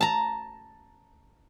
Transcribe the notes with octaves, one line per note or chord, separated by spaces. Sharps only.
A5 A#5